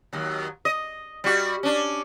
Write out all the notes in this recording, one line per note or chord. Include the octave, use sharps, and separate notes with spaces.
D#2 F#3
D#5
G3 F#4
C#4 D4